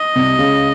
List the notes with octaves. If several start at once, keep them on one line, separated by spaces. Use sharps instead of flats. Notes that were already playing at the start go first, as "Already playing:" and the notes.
Already playing: D#5
C2 C3
C#2 C#3